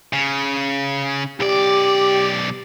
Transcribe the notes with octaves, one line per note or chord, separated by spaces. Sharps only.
C#3
B1 G4 D5